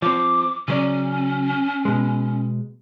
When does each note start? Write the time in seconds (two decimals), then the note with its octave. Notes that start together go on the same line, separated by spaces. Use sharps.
0.02 F3 C4 D6
0.68 C#3 F#3 C#4 D5
1.85 B2 G#3